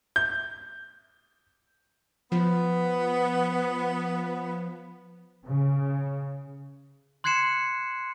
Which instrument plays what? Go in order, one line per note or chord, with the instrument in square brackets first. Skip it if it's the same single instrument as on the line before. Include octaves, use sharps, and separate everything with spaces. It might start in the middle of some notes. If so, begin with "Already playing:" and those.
[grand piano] G6
[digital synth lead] F3 [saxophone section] B3
[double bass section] C#3
[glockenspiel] C6 F#6 G#6 C7 C#7 E7